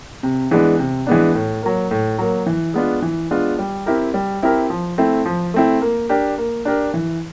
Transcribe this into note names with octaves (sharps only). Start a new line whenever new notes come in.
C3
E3 G#3 B3 D4
C3
E3 G#3 B3 D4
A2
F#3 A#3
A2
F#3 A#3
E3
G#3 B3 D4 F4
E3
G#3 B3 D4 F4
G3
C4 E4 G4 A#4
G3
C4 E4 G4 A#4
F3
A3 C4 E4
F3
A3 C4 E4
A#3
D4 G4 A#4
A#3
D4 G4 A#4
E3